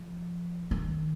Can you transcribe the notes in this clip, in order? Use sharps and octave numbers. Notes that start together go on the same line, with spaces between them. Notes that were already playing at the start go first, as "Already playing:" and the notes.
Already playing: F3
D#3